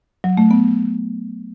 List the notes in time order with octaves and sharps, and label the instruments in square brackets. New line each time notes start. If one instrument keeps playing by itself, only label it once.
[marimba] F#3
A3
B3